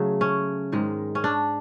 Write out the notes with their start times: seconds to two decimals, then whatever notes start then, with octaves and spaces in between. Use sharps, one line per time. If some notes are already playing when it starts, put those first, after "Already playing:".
Already playing: C#3 F#3 A3
0.21 C#4
0.72 G#2 D#3 G#3
1.15 C#4
1.24 D4